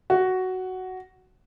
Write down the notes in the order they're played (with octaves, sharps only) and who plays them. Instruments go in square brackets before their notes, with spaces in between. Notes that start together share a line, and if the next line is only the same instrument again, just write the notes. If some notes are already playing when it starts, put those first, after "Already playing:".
[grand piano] F#4